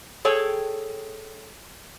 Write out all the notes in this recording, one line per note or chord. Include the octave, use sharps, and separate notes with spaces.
G#4 A4 C#5 G5